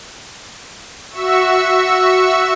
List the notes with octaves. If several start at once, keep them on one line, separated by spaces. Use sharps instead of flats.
F#4 E5 C#6 E6